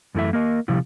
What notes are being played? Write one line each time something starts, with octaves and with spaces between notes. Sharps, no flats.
F#2 E3 A3 E4 E5
A#3 A#4 D#5
C3 F3 G3 E4